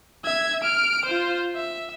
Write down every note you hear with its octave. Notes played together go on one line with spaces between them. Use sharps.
E5 G#6
F6 D7
F4 C5
E5